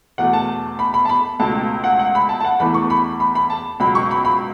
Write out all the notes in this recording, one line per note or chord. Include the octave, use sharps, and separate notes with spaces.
E2 B2 A3 F#5
A5
B5
B5
A5
B5
C#2 B2 A3 A5
F#5
F#5
B5
A5
A5
F#5
E2 E3 A3 B5
C#6
B5
B5
B5
A5
C#2 B2 F#3 B5
C#6
B5
B5